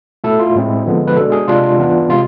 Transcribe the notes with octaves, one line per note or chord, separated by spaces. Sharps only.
B2 A3 E4 A4
F4
A2 G#3 C4 E4
D3 F3 G#3 B3
B4
B2 G#3 D4 A4
G#4
C3 G#3 D4 F4
E3 B3 D4
C3 G#3 F4